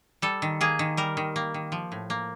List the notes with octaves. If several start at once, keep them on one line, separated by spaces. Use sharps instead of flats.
G3 A4
D#3
A#3 G#4
D#3
G3 A#4
D#3
A#3
D#3
F3
A2
A#3